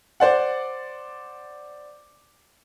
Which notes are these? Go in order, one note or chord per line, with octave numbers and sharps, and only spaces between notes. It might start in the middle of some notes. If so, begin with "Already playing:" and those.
C5 D5 F#5